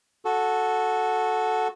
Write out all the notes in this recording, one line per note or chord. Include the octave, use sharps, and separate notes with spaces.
F#4 A4